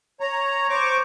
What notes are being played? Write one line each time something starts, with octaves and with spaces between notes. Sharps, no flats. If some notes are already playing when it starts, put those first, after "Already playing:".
C#5 A#5
C5 C#6 D6